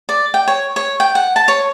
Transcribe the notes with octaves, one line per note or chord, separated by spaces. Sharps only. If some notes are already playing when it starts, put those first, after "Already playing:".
D5
G5
C#5
C#5
G5
F#5
A5
C#5